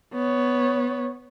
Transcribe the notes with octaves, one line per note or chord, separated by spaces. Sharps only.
B3 C#5